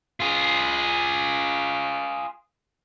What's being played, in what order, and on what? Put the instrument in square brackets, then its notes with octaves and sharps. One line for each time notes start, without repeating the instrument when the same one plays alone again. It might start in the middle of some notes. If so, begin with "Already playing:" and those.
[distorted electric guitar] F4 G#4